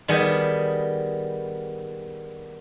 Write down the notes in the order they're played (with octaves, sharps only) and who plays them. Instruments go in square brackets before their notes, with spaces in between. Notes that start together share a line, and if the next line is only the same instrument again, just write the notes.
[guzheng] D#3 G3 B3 G#4 D#5